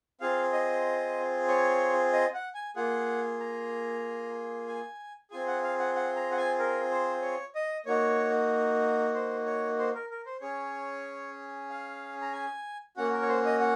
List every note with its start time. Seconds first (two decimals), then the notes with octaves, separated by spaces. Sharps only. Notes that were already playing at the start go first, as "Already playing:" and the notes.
0.21 C4 F4 G#4 F5
0.53 D#5
1.48 C#5
2.12 D#5
2.34 F#5
2.55 G#5
2.76 A#3 F4 G#4 F#5
3.40 A#5
4.68 G#5
5.31 C4 F4 G#4 G#5
5.47 F#5
5.63 F5
5.79 F#5
5.95 F#5
6.16 A#5
6.31 F#5
6.37 G#5
6.59 A#4
6.91 C5
7.22 C#5
7.55 D#5
7.86 A#3 D#4 F#4 C#5
9.14 C5
9.46 C#5
9.78 C5
9.94 A#4
10.10 A#4
10.26 C5
10.41 C#4 G#4 C#5
11.70 F5
12.22 A#5
12.33 G#5
12.97 A#3 C#4 F#4 F#5
13.13 A#4
13.22 C#5
13.29 C5
13.45 D#5
13.60 F#5